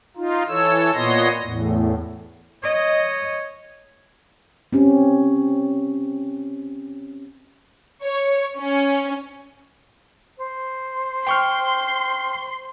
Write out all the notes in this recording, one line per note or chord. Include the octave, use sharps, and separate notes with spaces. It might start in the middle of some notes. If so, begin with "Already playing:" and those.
D#4 F4
E3 A4 C#5 E6
A#2 B3 C#5 D#5 C6 A#6
E2 A2
C#5 D#5
C4 C#4 G4
C#5
C#4
C5
G5 C6 C#6 F6